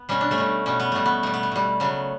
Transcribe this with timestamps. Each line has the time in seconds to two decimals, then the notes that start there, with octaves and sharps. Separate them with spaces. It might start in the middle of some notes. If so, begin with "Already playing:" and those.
Already playing: B3
0.09 B2 G3 C#4
0.21 D4
0.31 A3 C#4
0.38 B2 G3
0.66 B2 G3 C#4
0.80 B3
0.92 B2 G3 A3
1.06 B3
1.23 B2 G3 A3
1.34 B3
1.43 A3
1.52 B2 G3
1.80 C#3 F#3 A3 B3